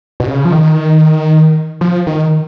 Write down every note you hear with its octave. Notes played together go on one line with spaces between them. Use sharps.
B2
C#3
F3
D#3
F3
D#3